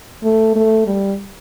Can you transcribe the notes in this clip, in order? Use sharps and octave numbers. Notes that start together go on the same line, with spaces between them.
A3
A3
G3